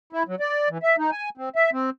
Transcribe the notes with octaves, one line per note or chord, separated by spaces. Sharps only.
E4
F#3
D5
E3
E5
D#4
G#5
C4
E5
C4